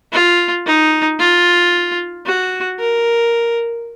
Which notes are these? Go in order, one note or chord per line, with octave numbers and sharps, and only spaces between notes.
F4
D#4
F4
F#4
A#4